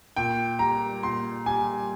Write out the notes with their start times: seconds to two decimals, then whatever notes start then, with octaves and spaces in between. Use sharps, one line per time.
0.16 A#2 G5
0.59 G3 A#5
1.03 A#2 C6
1.46 G3 G#5